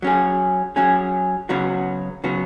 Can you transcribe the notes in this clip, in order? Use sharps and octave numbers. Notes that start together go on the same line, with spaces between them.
F#3 C#4 G#4
F#3 C#4 G#4
C#3 F#3 B3 F#4
C#3 F#3 B3 F#4